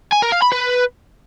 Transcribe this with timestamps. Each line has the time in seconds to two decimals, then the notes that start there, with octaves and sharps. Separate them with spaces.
0.12 G#5
0.22 A#4
0.32 F5
0.42 B5
0.52 B4